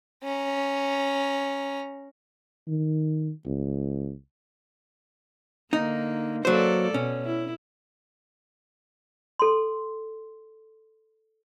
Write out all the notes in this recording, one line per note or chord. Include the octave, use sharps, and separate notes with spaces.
C#4 A#5
D#3
C#2
D3 A#3 D#4
F#3 A#3 A4 C5 D5
B2 C#4
E4
A4 C6